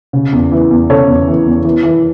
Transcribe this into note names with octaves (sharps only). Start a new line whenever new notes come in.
C#3
E2
E3
E2
C#3 A4 C#5
E2
E3
E2
E3
E3